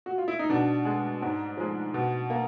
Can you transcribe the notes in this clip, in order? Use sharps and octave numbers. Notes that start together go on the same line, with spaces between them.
F#4
F4
E4
D#4
B2 D4
G#3
G#2
F3 G#3
B2
A#3